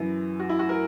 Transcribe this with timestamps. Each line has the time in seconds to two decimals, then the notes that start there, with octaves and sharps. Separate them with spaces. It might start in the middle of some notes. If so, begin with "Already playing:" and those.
Already playing: F#2 E3 E4
0.39 F#4
0.49 E4
0.59 F#4
0.69 A#4